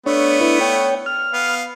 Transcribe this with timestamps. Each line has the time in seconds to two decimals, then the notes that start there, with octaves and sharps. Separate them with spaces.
0.06 A3 B3 D4 C#5
0.41 D4 E4 B4
0.60 C#5 G5
1.06 F6
1.33 B3 F5